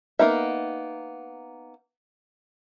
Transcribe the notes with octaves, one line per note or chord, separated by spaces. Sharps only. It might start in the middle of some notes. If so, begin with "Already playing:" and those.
A#3 B3 D#4 E5